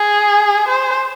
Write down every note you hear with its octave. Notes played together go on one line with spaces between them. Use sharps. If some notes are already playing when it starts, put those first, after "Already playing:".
Already playing: G#4
C5